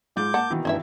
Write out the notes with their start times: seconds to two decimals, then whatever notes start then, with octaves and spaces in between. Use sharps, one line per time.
0.17 G#2 F4 D6 G6
0.34 A#3 F#5 A5
0.50 B2 D#3 E3
0.65 G2 C#4 E4 E5